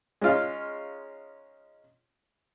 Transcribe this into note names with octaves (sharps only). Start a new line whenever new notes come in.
G#3 C#4 D#4 F4 F5